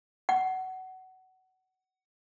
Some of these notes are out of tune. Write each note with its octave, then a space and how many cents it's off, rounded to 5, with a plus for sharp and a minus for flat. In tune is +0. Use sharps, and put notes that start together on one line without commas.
F#5 +20